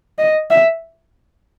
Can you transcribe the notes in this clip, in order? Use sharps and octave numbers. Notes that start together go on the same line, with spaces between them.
D#5
E5